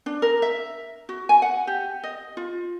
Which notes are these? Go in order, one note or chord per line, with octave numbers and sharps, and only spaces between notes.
D4
A#4
E5
F#4
G#5
F#5
G4
D#5
F4